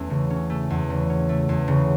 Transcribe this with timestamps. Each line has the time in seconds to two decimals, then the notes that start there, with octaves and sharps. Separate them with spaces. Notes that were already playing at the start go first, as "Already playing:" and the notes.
Already playing: E2 A3 C#4
0.10 C#3
0.30 C#4
0.50 A3
0.70 E2
0.90 C#3
1.10 C#4
1.29 A3
1.49 E2
1.68 C#3